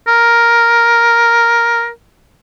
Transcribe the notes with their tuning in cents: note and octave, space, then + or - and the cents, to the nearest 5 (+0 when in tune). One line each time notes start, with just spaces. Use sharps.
A#4 +5